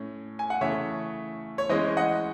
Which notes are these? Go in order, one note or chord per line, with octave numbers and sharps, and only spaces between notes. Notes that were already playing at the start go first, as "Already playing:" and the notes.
Already playing: A2 C#4
G#5
F#5
C#3 E3 A3 C#5 E5
C#5
E3 G#3 C#4 C5 D#5
D#5 F#5